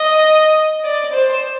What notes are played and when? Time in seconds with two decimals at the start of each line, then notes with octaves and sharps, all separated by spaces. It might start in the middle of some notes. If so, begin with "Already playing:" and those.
Already playing: D#5
0.84 D5
1.13 C5